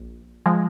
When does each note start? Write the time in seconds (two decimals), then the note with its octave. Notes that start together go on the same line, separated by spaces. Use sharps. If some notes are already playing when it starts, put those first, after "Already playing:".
Already playing: A#1
0.46 F3 G#3